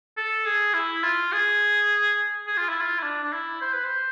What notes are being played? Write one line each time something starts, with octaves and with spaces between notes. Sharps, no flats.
A4
G#4
E4
F4
G#4
G#4
F4
E4
F4
E4
D4
D4
E4
C5
B4
C5